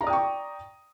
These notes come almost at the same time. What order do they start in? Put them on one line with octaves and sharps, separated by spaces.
A#5 D5 D#6 G5 C#6